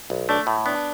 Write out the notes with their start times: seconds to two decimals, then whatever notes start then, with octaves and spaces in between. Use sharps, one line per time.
0.10 B1
0.29 A3 D4
0.47 A2
0.65 B3 D4